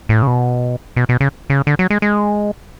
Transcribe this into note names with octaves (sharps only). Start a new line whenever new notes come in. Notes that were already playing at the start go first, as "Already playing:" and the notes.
A2
C#3
B2
B2
B2
C#3
C#3
D3
F#3
G#3
G#3